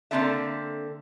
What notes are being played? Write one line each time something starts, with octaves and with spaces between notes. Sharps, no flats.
D3 A#3 C4 D#4 A4 E5